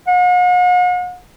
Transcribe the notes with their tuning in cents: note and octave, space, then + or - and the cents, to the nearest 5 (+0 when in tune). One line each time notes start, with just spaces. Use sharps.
F#5 -45